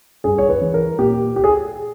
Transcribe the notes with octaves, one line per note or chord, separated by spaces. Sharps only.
G2 G#4
C#5
B4
E3
A#4
A#2 G4
G4
G#4